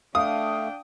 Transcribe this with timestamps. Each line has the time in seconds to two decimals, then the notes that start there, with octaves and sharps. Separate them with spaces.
0.15 A3 D4 F5 G5 D#6